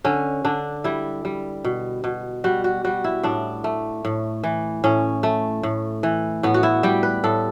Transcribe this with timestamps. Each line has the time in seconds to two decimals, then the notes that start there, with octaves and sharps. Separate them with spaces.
0.04 D3 C#4
0.45 D3 D4
0.84 G3 E4
1.25 G3
1.64 B2
2.04 B2
2.44 G3 F#4
2.64 F#4
2.85 G3 F#4
3.04 E4
3.23 A2 D4
3.64 A3
4.05 A2
4.44 E3
4.84 A2 C#4
5.23 A3
5.63 A2
6.03 E3
6.43 A2 B3
6.54 F#4
6.63 E4
6.83 G3 G4
7.03 B4
7.24 A2 A4